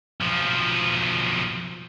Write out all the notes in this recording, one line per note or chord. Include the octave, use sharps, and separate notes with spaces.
B1 F3